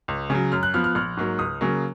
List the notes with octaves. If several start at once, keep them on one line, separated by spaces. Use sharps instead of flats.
C#2
C#3 F#3
F#2 F6
F#6
F3 B3 F6
F6
A#1 F6
G#2 F#3 A#3
C#2 D#6
C#3 F#3 A#3